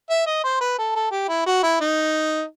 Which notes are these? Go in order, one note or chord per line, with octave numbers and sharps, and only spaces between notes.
E5
D#5
C5
B4
A4
A4
G4
E4
F#4
E4
D#4